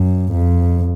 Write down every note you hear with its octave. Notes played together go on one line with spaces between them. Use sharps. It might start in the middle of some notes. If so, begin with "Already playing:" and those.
Already playing: F#2
F2